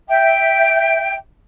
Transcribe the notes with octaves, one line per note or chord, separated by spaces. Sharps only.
E5 G5